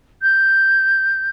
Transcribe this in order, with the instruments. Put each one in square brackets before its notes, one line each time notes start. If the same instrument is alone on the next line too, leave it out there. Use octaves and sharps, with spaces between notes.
[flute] G6